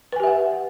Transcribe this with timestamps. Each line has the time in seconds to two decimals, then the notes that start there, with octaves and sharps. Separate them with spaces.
0.12 B4
0.16 G#5
0.20 G4
0.23 E5
0.27 F#5